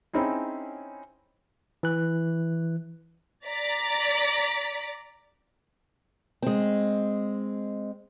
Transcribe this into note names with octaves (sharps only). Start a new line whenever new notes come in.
C4 C#4 D#4 E4 G#4
E3 F#6
D5 A#5 B6
G#3 C4